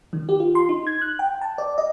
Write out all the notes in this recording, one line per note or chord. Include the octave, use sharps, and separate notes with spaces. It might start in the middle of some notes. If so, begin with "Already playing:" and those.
D#3
G4
F4
C6
D#4
G#6
F#6
G5
A5
D5
D#5